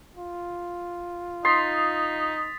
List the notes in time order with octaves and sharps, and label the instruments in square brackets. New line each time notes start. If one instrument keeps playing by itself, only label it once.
[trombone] F4
[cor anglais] D#4 [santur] C6 [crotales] D#6 A6 B6